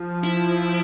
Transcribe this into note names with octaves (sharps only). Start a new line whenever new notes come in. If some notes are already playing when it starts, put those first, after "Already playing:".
Already playing: F3
E4